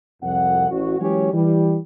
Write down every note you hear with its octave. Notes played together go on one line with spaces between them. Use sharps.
C2 F2 F#5
A1 F#4
E3 F#3 G#3 C#4 G4 C#5
E3 G3